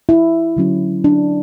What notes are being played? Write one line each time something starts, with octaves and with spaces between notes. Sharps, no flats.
E4
D3 F#3 C#4
D4